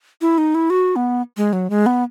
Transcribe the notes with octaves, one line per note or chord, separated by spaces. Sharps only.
E4
D#4
E4
F#4
B3
G#3
F#3
G#3
B3